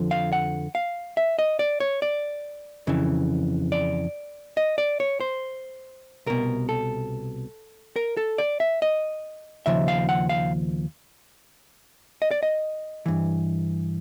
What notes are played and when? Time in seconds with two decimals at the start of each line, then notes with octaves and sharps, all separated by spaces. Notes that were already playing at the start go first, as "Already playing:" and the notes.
Already playing: F2 D3 F3
0.11 F5
0.33 F#5
0.75 F5
1.17 E5
1.39 D#5
1.59 D5
1.80 C#5
2.02 D5
2.87 F2 C#3 E3
3.72 D5
4.57 D#5
4.78 D5
5.00 C#5
5.20 C5
6.26 C2 B2 A#4
6.69 A4
7.96 A#4
8.17 A4
8.38 D5
8.60 E5
8.82 D#5
9.66 D#2 C#3 F3 E5
9.88 F5
10.09 F#5
10.29 F5
12.22 D#5
12.31 D5
12.43 D#5
13.06 G2 E3